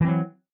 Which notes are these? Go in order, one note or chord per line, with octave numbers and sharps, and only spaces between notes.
E3 F#3 C4